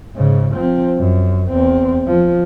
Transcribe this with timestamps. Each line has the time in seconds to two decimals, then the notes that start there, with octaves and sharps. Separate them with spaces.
0.15 G#2 C#3
0.55 F3 C4
0.98 F#2
1.49 E2 C4
2.07 F3